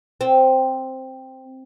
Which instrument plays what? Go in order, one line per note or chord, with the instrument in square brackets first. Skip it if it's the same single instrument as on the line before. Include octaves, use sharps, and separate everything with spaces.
[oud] C4